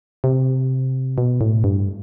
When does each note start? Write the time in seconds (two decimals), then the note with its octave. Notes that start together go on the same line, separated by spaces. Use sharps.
0.24 C3
1.18 B2
1.41 A2
1.64 G2